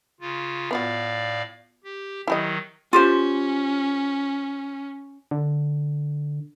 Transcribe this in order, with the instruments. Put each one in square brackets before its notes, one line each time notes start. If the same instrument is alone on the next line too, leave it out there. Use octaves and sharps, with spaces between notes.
[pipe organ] C#3 F4
[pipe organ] A2 D5 F5 [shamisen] B3 F4 F#4
[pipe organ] G4
[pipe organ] D#3 F#3 [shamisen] E4 G4 D#5
[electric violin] C#4 [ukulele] F4 G4 C5
[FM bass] D3